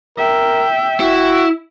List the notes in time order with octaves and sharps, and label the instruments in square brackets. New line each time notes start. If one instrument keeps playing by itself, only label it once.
[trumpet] A#4 [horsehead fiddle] E5 G5
[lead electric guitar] E4 [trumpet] F#4